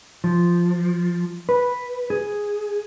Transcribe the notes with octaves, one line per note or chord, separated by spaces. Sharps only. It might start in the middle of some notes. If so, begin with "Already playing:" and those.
F3
B4
G#4